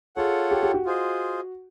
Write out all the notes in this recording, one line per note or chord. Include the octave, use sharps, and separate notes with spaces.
F4 G#4 A4 C#5 F#5
G4
G4
F#4
F4 G#4 C5 D#5